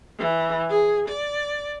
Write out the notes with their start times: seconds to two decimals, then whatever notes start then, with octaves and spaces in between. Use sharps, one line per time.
0.19 E3
0.70 G#4
1.09 D5